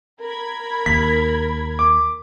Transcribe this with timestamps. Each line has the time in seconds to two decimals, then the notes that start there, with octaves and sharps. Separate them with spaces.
0.20 A#4 B5 G#6
0.86 D#2 B6
1.79 D6